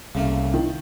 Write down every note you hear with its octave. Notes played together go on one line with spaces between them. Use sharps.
C2 C#3 A3 A#3
D#3